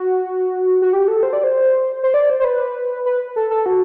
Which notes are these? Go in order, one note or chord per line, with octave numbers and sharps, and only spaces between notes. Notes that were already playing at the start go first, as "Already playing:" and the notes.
Already playing: F#4
F#4
G4
A4
C5
D5
C5
C5
D5
C5
C5
B4
B4
A4
A4
F#4